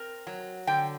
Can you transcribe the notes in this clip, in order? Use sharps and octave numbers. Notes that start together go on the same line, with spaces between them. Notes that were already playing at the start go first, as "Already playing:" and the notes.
Already playing: C4 A#4
F#3
D3 G5